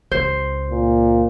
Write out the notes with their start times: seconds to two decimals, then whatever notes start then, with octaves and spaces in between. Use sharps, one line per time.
0.11 C#2 C5
0.70 A#2